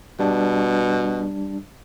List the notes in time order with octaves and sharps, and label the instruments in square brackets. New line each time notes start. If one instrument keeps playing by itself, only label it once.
[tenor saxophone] B2 [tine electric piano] G3 D4